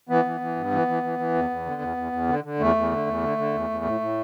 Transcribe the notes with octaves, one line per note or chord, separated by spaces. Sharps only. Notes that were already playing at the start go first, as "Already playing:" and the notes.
E3 B3
E3
E3
G2
E3
E3
E3
E3
E2
E2
D3
E2
E2
E2
D3
D3
E2 A3
E2
D3
E2
D3
D3
E2
E2
A2
A2